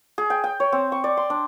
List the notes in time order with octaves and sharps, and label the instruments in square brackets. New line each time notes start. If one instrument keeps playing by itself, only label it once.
[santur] G#4
G5
G5
C#5
C4
C#6
D5
C6
D4